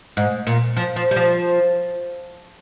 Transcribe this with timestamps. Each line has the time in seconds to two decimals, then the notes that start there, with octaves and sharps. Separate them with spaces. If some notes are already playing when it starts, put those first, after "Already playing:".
0.17 G#2
0.47 A#2
0.77 F3
0.96 F3
1.11 G3
1.16 F3